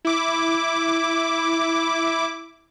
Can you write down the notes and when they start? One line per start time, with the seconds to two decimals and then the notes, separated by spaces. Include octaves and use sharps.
0.05 E4 D6